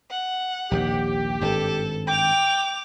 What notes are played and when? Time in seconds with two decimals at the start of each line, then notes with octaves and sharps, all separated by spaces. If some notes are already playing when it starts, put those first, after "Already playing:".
0.11 F#5
0.71 A#1 D#2 C3 G4
1.41 G#1 G2 A4
2.07 G5 D6 F7